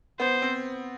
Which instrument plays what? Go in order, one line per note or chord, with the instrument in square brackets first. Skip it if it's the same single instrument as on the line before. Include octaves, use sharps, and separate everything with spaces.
[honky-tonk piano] B3 [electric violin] C5
[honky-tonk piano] C4